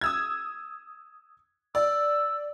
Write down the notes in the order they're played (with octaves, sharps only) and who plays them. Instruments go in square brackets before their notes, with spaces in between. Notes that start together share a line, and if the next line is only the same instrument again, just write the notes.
[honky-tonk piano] D#6 E6 G#6
[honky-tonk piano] D5 [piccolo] E6